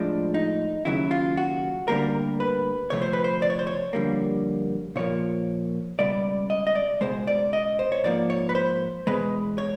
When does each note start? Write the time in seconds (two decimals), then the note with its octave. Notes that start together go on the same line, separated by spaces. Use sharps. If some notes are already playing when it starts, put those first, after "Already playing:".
Already playing: A2 F3 G#3 D4
0.34 D#4
0.85 D#2 C#3 F#3 E4
1.11 F4
1.37 F#4
1.88 D2 D3 G3 A#3 A#4
2.40 B4
2.90 D2 C3 F3 A3 C#5
3.02 C5
3.13 B4
3.24 C5
3.42 D5
3.50 C#5
3.59 C5
3.67 C#5
3.93 F2 D3 G3 A#3
4.96 A#2 F3 A#3 C#5
5.99 C#2 B2 G3 D5
6.50 D#5
6.67 D#5
6.75 D5
7.01 C#2 B2 G#3 C5
7.27 D5
7.53 D#5
7.79 C5
7.92 C#5
8.04 G#2 F3 A#3 D5
8.30 C#5
8.49 B4
8.55 C5
9.07 E2 B2 G#3 B4
9.58 C#5